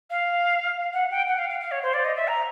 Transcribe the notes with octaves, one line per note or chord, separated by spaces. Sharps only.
F5
F#5
G5
F#5
F5
F5
F5
C#5
C5
D5
D#5
E5
A#5